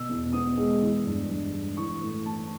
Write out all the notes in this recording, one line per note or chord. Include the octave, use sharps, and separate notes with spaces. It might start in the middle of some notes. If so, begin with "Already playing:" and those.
Already playing: B2 E6
E2
B3 D#6
G#3
E3
G2
G2
G3
E3 C#6
A2
A2 A5